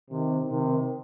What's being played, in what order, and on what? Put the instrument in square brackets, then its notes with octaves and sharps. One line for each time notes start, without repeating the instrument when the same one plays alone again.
[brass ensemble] C3 D#3
C3 D#3